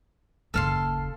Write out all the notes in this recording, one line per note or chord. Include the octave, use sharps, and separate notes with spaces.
F#1 D#2 A4 F5 C6